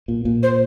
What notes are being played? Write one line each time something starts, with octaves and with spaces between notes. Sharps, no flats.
A#2
A#2
C5